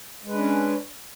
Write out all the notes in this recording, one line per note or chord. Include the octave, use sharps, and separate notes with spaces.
G#3 C#4 D4 B4